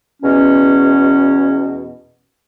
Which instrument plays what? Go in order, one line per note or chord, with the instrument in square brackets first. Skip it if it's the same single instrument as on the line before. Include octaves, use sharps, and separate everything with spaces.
[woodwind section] E2 B2 C#4